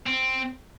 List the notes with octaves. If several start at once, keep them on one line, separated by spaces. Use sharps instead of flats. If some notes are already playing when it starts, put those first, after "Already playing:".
C4